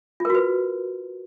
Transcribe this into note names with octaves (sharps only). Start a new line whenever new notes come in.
F4 F#4 A#4 B4